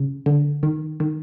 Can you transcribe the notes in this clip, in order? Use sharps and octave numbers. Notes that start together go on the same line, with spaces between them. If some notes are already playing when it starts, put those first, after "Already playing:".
Already playing: C#3
D3
D#3
D#3